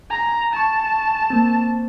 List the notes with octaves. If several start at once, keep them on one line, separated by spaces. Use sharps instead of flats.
G#5 A#5
G#5 A5 C#6
A#3 C4